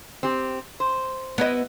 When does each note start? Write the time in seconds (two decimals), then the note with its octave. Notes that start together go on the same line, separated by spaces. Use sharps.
0.23 C4 G4
0.80 C5
1.38 B3 E4 D#5